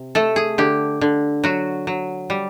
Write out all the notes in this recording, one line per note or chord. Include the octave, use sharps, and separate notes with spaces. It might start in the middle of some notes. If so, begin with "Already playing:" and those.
Already playing: C3
A3 A4
G#4
D3 G4
D3
F#3 F#4
F#3
G3